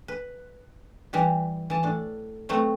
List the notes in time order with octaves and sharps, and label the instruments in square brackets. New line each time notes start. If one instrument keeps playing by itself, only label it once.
[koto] B4
E3 G3 B3 G4
E3 A5
A2 D4
F#3 A3 B3 C4